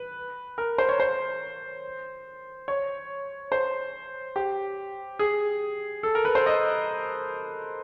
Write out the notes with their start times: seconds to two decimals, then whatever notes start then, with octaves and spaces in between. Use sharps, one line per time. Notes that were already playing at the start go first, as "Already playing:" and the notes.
Already playing: B4
0.58 A#4
0.78 C5
0.89 C#5
1.00 C5
2.68 C#5
3.52 C5
4.36 G4
5.19 G#4
6.03 A4
6.15 A#4
6.25 B4
6.35 C5
6.46 D#5